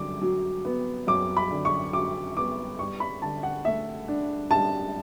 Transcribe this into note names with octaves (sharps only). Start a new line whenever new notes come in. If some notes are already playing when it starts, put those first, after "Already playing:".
Already playing: F#2 D3 D6
F#3
B3
F#2 D6
B5
D3
C#6
F#3 D6
B3 D6
G2 C#6
B5
D3 A5
F#5
A3 E5
D4
G2 A5